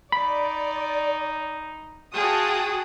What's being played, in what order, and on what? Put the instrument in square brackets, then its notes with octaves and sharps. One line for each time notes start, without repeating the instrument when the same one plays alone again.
[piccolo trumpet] D#4 [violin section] D5 [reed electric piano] B5
[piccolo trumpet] F4 [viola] F#4 G#4 [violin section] G5 A5 D#6